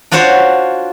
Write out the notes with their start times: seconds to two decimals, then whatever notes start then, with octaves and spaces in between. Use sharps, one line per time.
0.11 D4 F4 F#4 C5 C#5